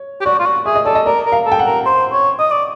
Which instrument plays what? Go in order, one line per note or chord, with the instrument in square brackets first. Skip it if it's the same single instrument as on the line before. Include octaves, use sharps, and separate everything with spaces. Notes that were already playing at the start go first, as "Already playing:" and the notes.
Already playing: [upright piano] C#5
[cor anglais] G4
[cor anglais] F#4 [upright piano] D5
[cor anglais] F4
F#4
[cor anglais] G#4 [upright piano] E5
[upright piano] D#5
[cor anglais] A4 [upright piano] D5
[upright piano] D#5
[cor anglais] A#4 [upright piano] D5
[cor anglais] A#4
[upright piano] F5
[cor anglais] A4
[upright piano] G5
F#5
[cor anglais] A#4
C5
C#5
D#5
D5